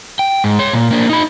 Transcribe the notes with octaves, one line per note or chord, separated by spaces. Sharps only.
G5
G#2
C#5 C6
A#2
A#3 D4
D#4 B5